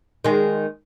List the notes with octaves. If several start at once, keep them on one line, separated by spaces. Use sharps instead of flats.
D#3 G#3